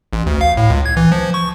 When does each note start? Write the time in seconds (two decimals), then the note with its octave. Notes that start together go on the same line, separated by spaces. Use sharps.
0.13 A1
0.26 D2
0.41 F5
0.57 A2
0.70 C#2
0.86 G#6
0.97 E3
1.12 F3
1.34 C#6